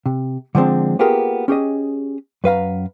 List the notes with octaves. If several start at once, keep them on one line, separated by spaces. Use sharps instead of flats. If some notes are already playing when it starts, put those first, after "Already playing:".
C3
D3 F3 G#3 C4 D4
A#3 B3 F4 G4 G#4 A#4
C#4 G4 G#4 D#5
F#2 B4 F5 A#5